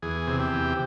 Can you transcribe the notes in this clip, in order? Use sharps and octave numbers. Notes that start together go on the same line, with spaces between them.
E2 G#4
C3
G4
E2